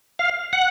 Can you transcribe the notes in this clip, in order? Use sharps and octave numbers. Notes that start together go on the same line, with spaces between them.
F5
F#5